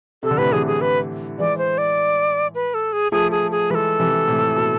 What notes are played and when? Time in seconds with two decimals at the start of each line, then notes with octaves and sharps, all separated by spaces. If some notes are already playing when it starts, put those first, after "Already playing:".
0.23 C3 A4
0.31 D3
0.38 A2 C3 B4
0.52 C3 E3 G#4
0.67 G#4
0.81 B4
1.39 E3 G#3 D5
1.58 C5
1.78 D5
2.55 B4
2.74 A4
2.93 G#4
3.12 F3 A3 G#4
3.31 G#4
3.51 G#4
3.70 E3 G#3 A4 B4
4.00 C3 E3
4.28 A2 C3
4.57 B2